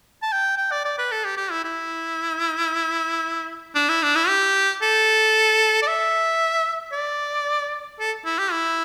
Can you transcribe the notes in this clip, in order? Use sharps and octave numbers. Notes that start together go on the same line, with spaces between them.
A5
G5
G5
D5
D5
B4
A4
G4
G4
E4
E4
D4
E4
D4
E4
G4
A4
D5
E5
D5
A4
E4
G4
E4